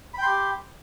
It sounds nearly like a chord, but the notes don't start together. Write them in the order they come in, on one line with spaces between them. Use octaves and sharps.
B5 G5 C6 G4